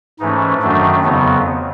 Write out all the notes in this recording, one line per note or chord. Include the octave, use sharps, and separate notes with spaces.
G#2 E3 A3 C#4 D#4
F#2 D#3 F#3 A3 D4
F2 C#3 F#3 B3 D#4